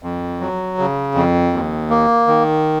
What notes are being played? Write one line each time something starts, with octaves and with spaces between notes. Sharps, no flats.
F2
F#3
C#3
F2
D#2
A#3
D#3